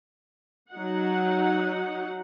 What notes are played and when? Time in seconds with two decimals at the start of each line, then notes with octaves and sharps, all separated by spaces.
0.72 F#3 D#4 F#5